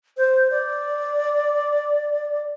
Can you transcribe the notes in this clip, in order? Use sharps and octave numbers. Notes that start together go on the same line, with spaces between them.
C5
D5